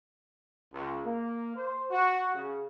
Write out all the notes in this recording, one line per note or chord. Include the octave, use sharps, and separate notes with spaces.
C#2
A#3
C5
F#4
C#3